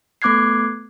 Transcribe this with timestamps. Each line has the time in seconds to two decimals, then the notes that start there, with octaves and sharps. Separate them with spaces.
0.22 A3 B3 D6 F#6 G#6 C7